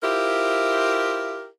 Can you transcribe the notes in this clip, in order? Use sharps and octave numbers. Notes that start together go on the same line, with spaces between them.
E4 F4 G4 A#4 C5 E5